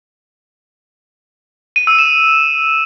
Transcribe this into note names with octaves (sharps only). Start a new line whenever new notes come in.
D#7
E6
E7